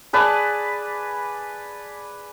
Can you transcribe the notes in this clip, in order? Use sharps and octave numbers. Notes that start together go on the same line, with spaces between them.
G#4 B4 D5 A5